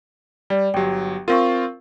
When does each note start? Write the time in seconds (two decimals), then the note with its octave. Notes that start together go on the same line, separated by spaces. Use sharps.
0.50 G3 D5
0.74 G1 F#3 G4 G5
1.28 C4 F4 A#4 F5 C#6